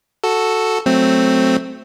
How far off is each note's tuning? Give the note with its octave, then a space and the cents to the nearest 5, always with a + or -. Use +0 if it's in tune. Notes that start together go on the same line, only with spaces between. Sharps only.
F#4 +0 A4 +0
F#3 +0 A3 +0 C4 +0